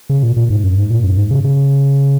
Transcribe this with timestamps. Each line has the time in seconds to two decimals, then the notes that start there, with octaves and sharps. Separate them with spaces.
0.10 C#3
0.23 A#2
0.37 A#2
0.50 G#2
0.64 F#2
0.77 G#2
0.90 A#2
1.04 F#2
1.17 G#2
1.31 C#3
1.44 C#3